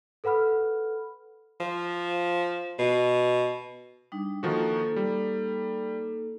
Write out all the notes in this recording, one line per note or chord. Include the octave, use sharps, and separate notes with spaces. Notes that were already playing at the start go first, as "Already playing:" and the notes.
A4 B4 F#5 B5 F6
F3
B2
G3 D4 D#4
D#3 F3 A#3 D#4 F#4 A4
G3